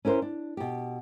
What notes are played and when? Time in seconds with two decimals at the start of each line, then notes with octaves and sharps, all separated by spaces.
0.05 C#4 E4 A#4 C5
0.22 D4
0.57 B2 G4